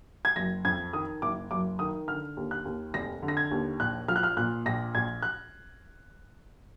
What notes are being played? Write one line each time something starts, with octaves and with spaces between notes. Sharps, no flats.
G#6
F#1 A#6
F2 G#6
D#3 D#6
F#1 D6
F#1 D6
D#3 D#6
D3 F6
D#2
F#6
D#2
F1 A#6
D3
A#6
G#6
D#2
A#1 F#6
F3 F6
F#6
F6
A#2 F#6
A#1 A#6
A#1 G#6
F#6